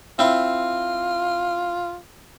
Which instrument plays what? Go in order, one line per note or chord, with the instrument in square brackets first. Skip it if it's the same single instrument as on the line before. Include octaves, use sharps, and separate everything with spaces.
[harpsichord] C4 E4 [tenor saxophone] F4